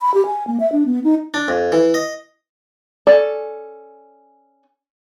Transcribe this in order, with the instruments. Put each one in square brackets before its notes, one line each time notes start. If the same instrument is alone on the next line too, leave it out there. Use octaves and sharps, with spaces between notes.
[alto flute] B5
G4
G#5
A#3
E5
D4
B3
D#4
[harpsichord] D4
F2
E3
D#5
[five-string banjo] C#4 A4 D5